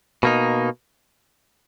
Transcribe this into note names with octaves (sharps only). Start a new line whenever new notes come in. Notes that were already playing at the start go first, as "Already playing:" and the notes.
B2 A#3 D#4